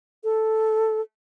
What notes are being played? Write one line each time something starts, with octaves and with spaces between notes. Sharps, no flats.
A4